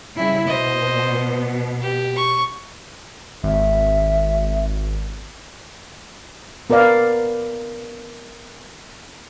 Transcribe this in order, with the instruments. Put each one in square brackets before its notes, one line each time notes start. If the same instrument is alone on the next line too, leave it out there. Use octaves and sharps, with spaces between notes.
[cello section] C#3 G3 E4
[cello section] B2 B3 [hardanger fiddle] C5 D#5
[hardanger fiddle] G4
C#6
[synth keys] G#1 [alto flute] E5
[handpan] B3 A#4 B4 D5 F5